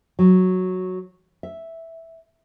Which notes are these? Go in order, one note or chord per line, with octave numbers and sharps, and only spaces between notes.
F#3
E5